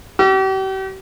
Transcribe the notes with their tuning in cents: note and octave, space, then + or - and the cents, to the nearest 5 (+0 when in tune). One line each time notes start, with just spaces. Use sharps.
G4 -40 E6 +45